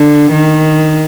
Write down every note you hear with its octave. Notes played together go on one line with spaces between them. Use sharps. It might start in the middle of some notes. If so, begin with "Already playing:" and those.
Already playing: D3
D#3